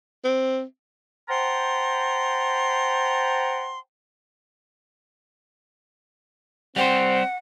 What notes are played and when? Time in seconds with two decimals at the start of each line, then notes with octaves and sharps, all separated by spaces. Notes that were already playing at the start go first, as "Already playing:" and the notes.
0.25 C4
1.29 C5 F#5 G5 A5 A#5 C6
6.76 G3 C4 G4 C5 F#5